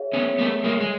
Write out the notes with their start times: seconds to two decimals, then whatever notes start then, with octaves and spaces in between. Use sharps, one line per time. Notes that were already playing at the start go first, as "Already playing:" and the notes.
Already playing: G#4 C#5 E5
0.13 B3 C#4
0.38 A3 B3
0.64 G#3 A#3
0.81 G#3